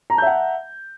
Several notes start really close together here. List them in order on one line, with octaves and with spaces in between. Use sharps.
A#5 A5 G6 E5 F#5